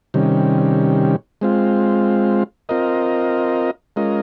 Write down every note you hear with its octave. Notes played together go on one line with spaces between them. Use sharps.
C3 D#3 G3 C#4
G#3 C4 F4
C4 F4 A#4 D#5
G#3 C#4 F4 A#4 D#5